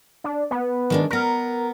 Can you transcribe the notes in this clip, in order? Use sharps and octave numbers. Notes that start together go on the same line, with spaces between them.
D4
B3
D#3 G#3 D4
B3 A#4 A#5